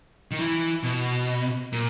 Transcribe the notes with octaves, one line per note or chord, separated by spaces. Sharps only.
D#3
E3
B2
A#2